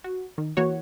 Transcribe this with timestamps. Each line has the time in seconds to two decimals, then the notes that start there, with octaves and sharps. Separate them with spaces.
0.04 F#4
0.38 D#3
0.57 E3 A#3 F#4 C#5